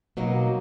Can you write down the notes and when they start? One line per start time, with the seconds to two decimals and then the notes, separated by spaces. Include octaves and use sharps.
0.17 B2 F#3 A#3 D#4